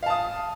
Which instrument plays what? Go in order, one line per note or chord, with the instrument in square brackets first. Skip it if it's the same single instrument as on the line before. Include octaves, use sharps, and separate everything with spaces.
[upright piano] F5
A5
D#6